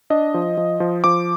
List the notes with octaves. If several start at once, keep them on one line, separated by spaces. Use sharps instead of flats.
D4 D#5
F3
F3
F3
F3 D6